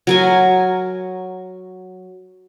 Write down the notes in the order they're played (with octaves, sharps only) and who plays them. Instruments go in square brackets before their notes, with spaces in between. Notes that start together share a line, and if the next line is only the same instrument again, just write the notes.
[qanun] F#3 A#4 G#5